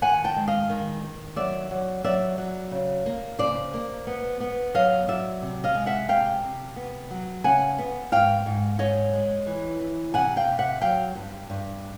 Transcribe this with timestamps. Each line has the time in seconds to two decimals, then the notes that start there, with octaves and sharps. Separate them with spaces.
0.02 D#3 F#5 G#5
0.24 G5 A5
0.36 G#3
0.48 D#5 F5
0.70 D#3
1.03 D#3
1.36 F#3 D5 E5
1.71 F#3
2.04 F#3 D5 E5
2.38 F#3
2.71 C#3
3.06 A#3
3.39 C#3 C5 D5
3.74 A#3
4.07 B3
4.40 B3
4.74 F#3 D#5 F5
5.08 F#3 D5 E5
5.42 C3
5.64 D#5 F5
5.75 G#3
5.86 E5 F#5
6.09 C3 F5 G5
6.43 C3
6.76 B3
7.10 F#3
7.44 C#3 F#5 G#5
7.78 B3
8.12 G#2 F5 G5
8.46 G#2
8.79 G#2 C#5 D#5
9.13 G#3
9.47 E3
9.80 E3
10.14 C3 F#5 G#5
10.36 F5 G5
10.48 C3
10.59 E5 F#5
10.81 F#3 F5 G5
11.15 G2
11.50 G2